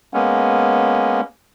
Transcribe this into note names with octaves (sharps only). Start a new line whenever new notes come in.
G#3 A#3 B3 C#4